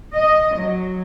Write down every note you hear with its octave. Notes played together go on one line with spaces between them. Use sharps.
D#5
F#3